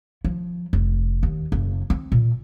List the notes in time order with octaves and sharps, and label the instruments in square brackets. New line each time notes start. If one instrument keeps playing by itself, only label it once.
[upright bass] F3
F1
D#2
F#1
C4
A#2